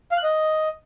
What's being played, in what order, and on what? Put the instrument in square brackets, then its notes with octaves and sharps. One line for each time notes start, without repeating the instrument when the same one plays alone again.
[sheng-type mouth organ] F5
F#6
D#5